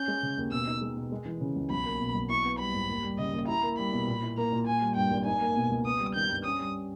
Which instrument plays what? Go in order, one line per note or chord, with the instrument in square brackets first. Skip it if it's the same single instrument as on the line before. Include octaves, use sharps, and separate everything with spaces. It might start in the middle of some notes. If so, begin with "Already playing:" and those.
Already playing: [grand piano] C#4 [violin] G6
[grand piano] G#3
C#3
D#2
[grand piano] B2 [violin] E6
[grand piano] D#4
G#3
B2
G#3
E3
C#3
C#2
[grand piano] B1 [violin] B5
[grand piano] A#3
B2
B1
[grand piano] E4 [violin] C#6
[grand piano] B3
[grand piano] G3 [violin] B5
[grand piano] G#2
D#2
G3
[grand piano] C#3 [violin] D#5
[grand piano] D#2
[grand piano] E4 [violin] A#5
[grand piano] A#3
[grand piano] G3 [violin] B5
[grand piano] B2
A#2
E4
[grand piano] A#3 [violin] A#5
[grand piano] A#2
[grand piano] A#3 [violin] G#5
[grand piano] G3
[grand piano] G2 [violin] G5
[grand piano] G#1
[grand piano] D#4 [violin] G#5
[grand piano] A#3
B2
C#2
[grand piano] B3 [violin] D#6
[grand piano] G3
[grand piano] D#3 [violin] G6
[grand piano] G2
[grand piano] C#4 [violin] D#6
[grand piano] G3